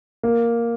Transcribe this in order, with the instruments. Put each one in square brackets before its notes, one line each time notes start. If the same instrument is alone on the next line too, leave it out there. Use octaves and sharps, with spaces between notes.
[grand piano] A#3